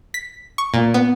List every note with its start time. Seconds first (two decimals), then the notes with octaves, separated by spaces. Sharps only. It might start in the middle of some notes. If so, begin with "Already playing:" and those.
0.14 B6
0.58 C#6
0.74 A#2
0.94 B3